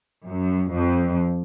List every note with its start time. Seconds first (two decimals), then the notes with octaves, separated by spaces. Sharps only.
0.26 F#2
0.73 F2